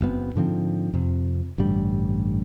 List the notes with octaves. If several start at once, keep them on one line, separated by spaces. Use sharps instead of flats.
F#1 F#2 B3 C4
G#2 D3 F3 C4
F2 C3
A1 G2 D3 G3